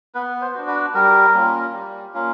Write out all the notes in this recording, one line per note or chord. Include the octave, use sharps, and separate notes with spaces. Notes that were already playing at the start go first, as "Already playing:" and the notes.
B3 B4
C5
D4 F#4
B4
G3 A#4
A#3 C#4 F4
G3
A#3 C#4 F4